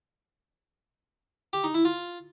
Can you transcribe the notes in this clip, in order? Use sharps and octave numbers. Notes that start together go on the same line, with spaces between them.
G4
D#4
E4
F4